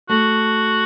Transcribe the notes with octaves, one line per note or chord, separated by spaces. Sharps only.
A3 F#4